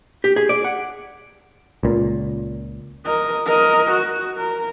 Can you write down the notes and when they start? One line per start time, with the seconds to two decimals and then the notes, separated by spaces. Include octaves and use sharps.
0.24 G4
0.36 G#4
0.49 D5
0.64 F#5
1.83 C#2 A#2
3.06 A#4 D#5
3.46 A#4 D#5
3.91 F#4
4.37 A#4